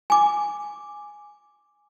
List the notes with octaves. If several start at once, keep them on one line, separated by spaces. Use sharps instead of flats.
G#5 D6